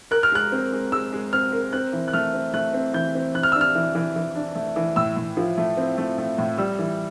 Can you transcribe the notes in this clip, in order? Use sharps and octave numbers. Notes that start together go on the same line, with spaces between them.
A#4 F#6
F6
G#3 F#6
C4
G#3
G#3 E6
G#3
C4 F6
A#4
C4 F#6
E3
F#6
A3 F6
C4
A3 F#6
C4
E3 G6
C4
E3 F#6
F6
D4 E6
F6
E3
E3
E3
D4
A3
E3
A2 E6
A2
F3
A3
C4
A3
A3
A2
G3 E6
E3